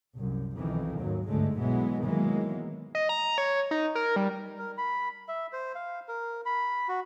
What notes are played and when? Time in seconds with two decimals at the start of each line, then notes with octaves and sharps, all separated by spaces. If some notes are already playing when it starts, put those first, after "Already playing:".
0.15 C2 F#2
0.56 B1 F2 D#3 E3
0.98 D#2 G#2 F#3
1.28 G1 D2 G#2 D3 G#3 A3
1.58 B1 B2 E3 F#3 G#3 B3
2.03 D#3 E3 F#3 G#3 A#3 B3
2.95 D#5
3.09 A#5
3.38 C#5
3.71 D#4
3.95 A#4
4.16 G3
4.58 A#4
4.78 B5
5.28 E5
5.53 C5
5.75 F5
6.08 A#4
6.46 B5
6.88 F#4